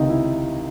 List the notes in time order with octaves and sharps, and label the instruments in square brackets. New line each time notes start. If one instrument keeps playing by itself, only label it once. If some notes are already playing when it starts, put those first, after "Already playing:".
Already playing: [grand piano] C#2 C3 D#3 D#4
E4